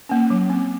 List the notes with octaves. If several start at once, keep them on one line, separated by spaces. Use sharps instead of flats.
A#3 C#4
F#3
C4